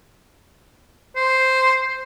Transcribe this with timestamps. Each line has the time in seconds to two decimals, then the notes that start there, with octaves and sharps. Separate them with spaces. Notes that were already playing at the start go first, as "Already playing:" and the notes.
1.16 C5